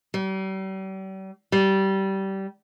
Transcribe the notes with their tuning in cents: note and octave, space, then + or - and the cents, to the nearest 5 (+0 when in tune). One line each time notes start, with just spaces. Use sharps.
G3 -40
G3 -20